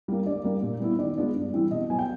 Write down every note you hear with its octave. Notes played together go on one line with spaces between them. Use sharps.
G3 A#3
D3 D5
G3 A#3
A#2
G3 B3 E4
D#3 D5
G#3 B3 D4 F4
G2
E3 G3 C4 E4
B2 D#5
F#3 B3 G#5
G5